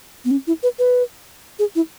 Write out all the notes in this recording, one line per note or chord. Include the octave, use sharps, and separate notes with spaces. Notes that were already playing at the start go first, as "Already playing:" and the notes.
B3
C#4
E4
B4
B4
G#4
E4